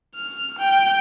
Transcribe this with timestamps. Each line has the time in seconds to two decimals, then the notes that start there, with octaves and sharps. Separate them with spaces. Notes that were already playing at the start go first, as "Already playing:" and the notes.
0.16 F6
0.59 G5